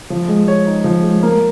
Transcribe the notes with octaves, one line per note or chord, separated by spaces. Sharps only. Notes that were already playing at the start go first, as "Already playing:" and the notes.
F3
G#3
C#5
D#4
F3
G#3
A#3